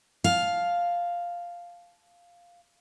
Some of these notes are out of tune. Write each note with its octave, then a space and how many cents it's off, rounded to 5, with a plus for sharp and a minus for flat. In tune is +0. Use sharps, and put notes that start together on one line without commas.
F5 +0 A5 -20